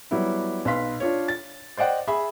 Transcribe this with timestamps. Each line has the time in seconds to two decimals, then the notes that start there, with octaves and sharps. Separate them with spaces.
0.11 F#3 G3 B3 E4
0.65 B1 B4 F5 C6 B6
1.00 D4 F4 C#5
1.28 A6
1.77 C5 D5 D#5 F#5 G5
2.07 G#4 E5 B5